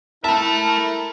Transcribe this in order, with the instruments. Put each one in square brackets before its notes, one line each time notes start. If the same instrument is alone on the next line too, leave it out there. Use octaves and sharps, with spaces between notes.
[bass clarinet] E4 [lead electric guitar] A4 E5 [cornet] A#4 [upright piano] A5